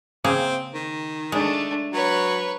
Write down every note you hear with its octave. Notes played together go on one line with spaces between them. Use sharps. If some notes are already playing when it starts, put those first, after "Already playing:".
C#3 A#3 C4 G#4
D#3
G#3 A3 D4
F#3 B4 C#5